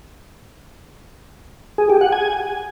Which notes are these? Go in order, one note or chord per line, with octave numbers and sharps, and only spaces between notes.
G#4
G4
F#5
G#5